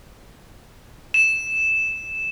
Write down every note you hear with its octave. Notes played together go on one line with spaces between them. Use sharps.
E7